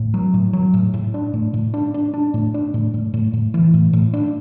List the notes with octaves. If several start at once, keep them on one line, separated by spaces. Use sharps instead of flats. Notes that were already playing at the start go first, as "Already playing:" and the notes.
Already playing: A2
F#3
A2
F#3
A2
A2
D4
A2
A2
D4
D4
D4
A2
D4
A2
A2
A2
A2
E3
A2
A2
D4